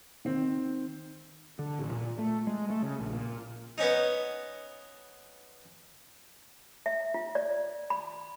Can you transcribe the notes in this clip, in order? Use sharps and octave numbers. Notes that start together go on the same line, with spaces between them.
D#3 C4
D3
A1
A#2
A3
G#3
A3
C#3
A#1
A#2
B3 C#4 D#4
E5
F4
D5
B5